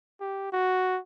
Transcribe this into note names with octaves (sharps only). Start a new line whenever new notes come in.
G4
F#4